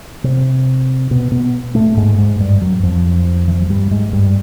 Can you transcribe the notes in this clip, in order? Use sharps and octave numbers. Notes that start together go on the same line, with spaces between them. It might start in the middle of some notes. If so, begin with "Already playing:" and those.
C3 C4
B2 B3
B2 B3
A2 A3
G#2 G#3
G#2 G#3
G2 G3
F#2 F#3
F2 F3
E3
F3
F#3
G2 G3
G#2 G#3
G2 G3